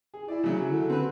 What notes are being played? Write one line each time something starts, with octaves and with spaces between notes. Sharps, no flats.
G#4
E4 D5
C#3 F#3
D3
C4 B4